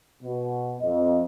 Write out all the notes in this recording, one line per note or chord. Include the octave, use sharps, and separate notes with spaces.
B2
F2 D#5